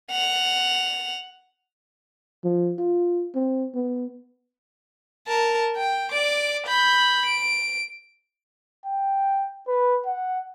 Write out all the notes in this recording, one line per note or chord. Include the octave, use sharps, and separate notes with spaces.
F#5 F7
F3
F4
C4
B3
A#4 A5
G5
D5 D6
B5 G6
D7
G5
B4
F#5